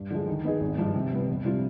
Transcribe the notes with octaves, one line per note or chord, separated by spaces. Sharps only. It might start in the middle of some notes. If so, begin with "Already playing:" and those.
Already playing: G2
D3 F3 G#3
D#3
B3 D#4 G#4
G#1
G2 F3
C3
G3 B3
F2
C3 G3 D4 F4